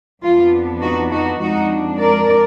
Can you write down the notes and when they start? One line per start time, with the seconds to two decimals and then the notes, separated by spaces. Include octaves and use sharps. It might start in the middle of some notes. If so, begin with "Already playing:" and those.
0.23 F2 F3 B3 D4 F4
0.82 D#4 F#4
1.11 D#4 F#4
1.40 F2 F3 G#3 D4 D#4 F#4
1.99 A#4 D5